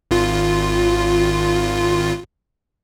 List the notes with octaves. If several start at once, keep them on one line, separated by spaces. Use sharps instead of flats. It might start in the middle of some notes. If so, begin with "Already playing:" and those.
G#1 F4